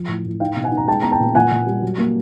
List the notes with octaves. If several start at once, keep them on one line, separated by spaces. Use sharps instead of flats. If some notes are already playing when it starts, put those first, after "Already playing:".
Already playing: F3
A2
A2
D#4 F5 G5
B2
F#5 G#5
D#4
A#5
G#3 G5 A5
B3 A#5
G5 A5
A#2
A#2 F#5 G#5
A#2
G3
F#3
A#3